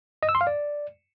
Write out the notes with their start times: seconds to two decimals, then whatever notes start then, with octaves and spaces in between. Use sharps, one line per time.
0.23 D#5
0.29 E6
0.35 C6
0.41 F5
0.47 D5